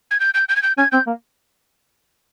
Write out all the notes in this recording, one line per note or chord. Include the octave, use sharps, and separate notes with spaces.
G#6
G6
G6
G6
G#6
G6
C#4 G#6
C4 G6
A#3